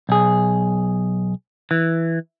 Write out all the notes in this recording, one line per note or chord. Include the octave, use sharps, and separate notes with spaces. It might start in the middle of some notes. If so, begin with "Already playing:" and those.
B1 G#4
E3